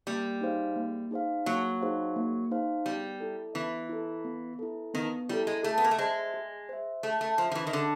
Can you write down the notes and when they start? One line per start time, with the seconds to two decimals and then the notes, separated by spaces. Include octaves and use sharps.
0.07 G3 A#3
0.41 D#4 G#4 C5 F5
0.76 A#3
1.11 D#4 G#4 C5 F5
1.46 F#3 A#3
1.81 D#4 G#4 C5 F5
2.16 A#3
2.51 D#4 G#4 C5 F5
2.86 G3 B3
3.20 E4 A4
3.55 E3 B3
3.89 E4 A4
4.25 B3
4.59 E4 A4
4.94 D#3 B3
5.29 G3 E4 A4
5.47 G#3
5.63 A3 G#4
5.78 B3
5.84 A#3
5.91 A3
5.98 G#3 C5 E5
6.34 G#4
6.69 C5 E5
7.03 A3 G#4
7.21 A3
7.38 F3 C5 E5
7.52 F3
7.55 E3
7.67 D#3
7.73 D3 G#4